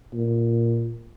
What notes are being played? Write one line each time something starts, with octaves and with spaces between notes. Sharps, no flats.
A#2